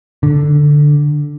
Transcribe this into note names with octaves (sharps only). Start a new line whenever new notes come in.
D3